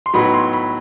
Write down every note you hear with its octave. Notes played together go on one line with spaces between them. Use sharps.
C6
A2 F#3 B3 D#4 B5
C6
B5